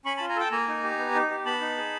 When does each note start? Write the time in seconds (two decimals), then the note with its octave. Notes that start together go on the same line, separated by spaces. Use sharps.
0.05 C#4 B5 C#6
0.17 A5 B5
0.21 F4
0.29 G#5 A#5
0.36 A4 G5 A5
0.52 A#3 G#5 A#5
0.68 D#4
0.84 G4
0.99 B3
1.15 D#4
1.30 G4
1.46 B3 A5 B5
1.61 D#4
1.77 G#4